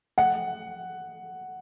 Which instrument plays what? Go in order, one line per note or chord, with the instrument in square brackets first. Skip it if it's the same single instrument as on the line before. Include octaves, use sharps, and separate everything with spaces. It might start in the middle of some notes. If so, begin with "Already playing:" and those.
[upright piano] F#5